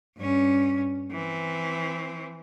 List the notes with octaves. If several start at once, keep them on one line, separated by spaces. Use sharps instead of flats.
G2 C#4
E3 C4